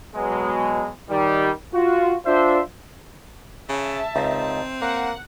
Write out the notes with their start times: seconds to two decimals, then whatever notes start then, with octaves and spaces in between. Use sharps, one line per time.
0.16 B2 F#3 G#3
1.09 D#3 G3
1.74 F4 F#4
2.26 D4 F4 C5 E5
3.69 C#3 E5 A5
4.16 C#2 C4 D#4
4.82 A#3 C#5 F#5